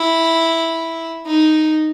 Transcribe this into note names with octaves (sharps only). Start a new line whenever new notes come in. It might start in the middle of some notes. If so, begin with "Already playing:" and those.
Already playing: E4
D#4